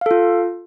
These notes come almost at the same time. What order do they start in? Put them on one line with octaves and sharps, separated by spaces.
F5 A4 F4